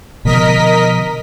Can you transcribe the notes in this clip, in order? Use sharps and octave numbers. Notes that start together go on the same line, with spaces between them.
B2 D3 F3 A#4 D#5 B6